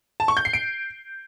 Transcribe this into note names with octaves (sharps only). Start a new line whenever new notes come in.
A5
C#6
G6
C7
D7